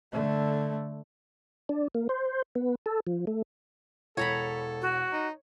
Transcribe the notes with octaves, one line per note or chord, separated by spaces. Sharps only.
D3 A3
D4
A#3
C5
B3
A4
F3
A3
E1 A4 C#5 A#5 B5
F#4
D#4